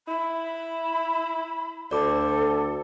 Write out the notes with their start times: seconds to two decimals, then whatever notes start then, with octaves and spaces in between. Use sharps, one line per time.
0.08 E4 B5
1.91 D2 A4 C5 D5 D6